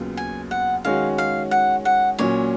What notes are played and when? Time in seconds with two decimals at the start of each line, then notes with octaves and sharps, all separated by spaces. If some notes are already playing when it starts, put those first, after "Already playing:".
Already playing: D#2 C#3 F#3 B3 F4
0.17 G#5
0.51 F#5
0.84 D#3 G#3 C#4 F#4 F5
1.18 F5
1.51 F#5
1.85 F#5
2.18 A#2 F#3 C#4 C#5